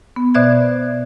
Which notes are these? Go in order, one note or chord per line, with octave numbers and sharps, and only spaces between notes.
B3
B2 C5 D5 E5 F#6 G#6